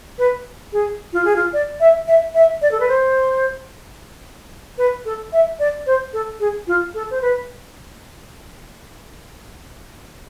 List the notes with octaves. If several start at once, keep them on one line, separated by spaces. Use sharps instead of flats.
B4
G#4
F4
G#4
F4
D5
E5
E5
E5
D5
A4
B4
C5
B4
A4
E5
D5
C5
A4
G#4
F4
A4
C5
B4